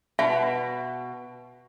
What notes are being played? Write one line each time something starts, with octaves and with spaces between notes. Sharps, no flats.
B2 E5